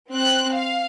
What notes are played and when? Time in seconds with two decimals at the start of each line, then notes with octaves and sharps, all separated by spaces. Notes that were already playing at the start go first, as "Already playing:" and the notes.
0.12 C4 F#6
0.54 F5